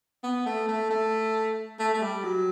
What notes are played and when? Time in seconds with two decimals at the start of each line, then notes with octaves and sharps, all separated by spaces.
0.23 B3
0.46 A3
0.68 A3
0.90 A3
1.79 A3
1.94 A3
2.02 G3
2.24 F#3